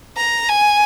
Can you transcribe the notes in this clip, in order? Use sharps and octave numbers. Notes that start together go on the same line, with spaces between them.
A#5
G#5